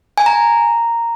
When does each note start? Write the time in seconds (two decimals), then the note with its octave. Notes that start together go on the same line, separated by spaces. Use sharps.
0.18 G#5
0.26 A#5